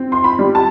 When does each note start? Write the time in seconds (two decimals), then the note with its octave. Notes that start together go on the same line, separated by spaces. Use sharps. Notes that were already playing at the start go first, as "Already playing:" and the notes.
Already playing: C4
0.12 C6
0.24 B5
0.39 G3
0.55 A5